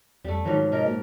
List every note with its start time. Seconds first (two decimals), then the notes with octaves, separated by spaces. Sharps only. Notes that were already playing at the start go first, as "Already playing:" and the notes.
0.24 F2 G3 A3
0.45 G#2 D#3 F3 F#3 F4
0.72 C3 F3 A#4 D#5
0.86 A#2 F#4